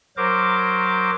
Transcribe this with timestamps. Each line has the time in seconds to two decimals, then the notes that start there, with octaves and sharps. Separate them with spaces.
0.17 F#3 A#4 C5 D6